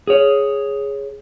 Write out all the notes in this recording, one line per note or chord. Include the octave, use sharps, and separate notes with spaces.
G#4 C#5